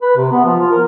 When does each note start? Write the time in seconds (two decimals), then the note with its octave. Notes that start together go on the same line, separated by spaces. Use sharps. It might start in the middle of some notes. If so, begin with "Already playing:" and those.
0.02 B4
0.17 C3
0.32 B3
0.45 F3
0.59 F4
0.71 A#4